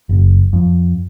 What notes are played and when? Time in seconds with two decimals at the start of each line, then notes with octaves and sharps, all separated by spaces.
0.09 F#1
0.53 F2